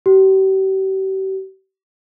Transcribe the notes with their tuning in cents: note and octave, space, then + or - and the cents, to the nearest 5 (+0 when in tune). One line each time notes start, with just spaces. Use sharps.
G4 -40